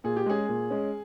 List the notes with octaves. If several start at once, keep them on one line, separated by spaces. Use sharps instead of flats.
A#2 G#4
G4
G#3 C#4 G#4
A#2
G#3 C#4